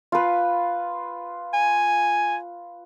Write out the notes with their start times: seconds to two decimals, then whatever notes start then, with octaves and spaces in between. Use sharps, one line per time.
0.12 F4 B4
1.54 G#5